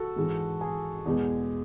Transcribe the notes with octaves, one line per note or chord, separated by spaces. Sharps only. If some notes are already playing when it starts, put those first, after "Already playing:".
Already playing: F#4 A4
G#2 E3 G#3
G#4
E2 B2 G#3